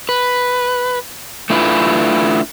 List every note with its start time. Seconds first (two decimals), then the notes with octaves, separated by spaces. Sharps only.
0.09 B4
1.50 A3 D4 E4 F4 B4